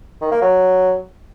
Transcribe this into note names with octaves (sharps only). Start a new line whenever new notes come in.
D#3
A#3
F#3